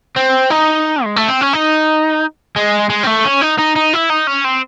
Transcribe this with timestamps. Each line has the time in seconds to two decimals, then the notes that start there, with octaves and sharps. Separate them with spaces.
0.16 C4
0.50 D#4
1.04 G#3
1.16 A3
1.28 C4
1.41 C#4
1.53 D#4
2.56 G#3
2.90 G#3
3.03 C4
3.07 A3
3.25 C#4
3.42 D#4
3.59 D#4
3.76 D#4
3.94 E4
4.10 D#4
4.27 C#4
4.45 C4